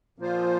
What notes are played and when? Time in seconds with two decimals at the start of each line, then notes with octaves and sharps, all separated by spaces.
0.18 A#2 F3 A#3 F4 C5